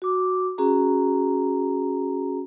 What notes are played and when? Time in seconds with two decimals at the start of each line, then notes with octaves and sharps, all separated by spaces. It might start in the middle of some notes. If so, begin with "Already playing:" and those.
0.02 F#4 D6
0.58 C#4 F#4 G#4 A#5